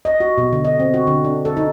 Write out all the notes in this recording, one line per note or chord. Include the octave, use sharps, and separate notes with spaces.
D#5
F#4
B2
D3
D#5
C4
F#4
D3
D4
A4
D#4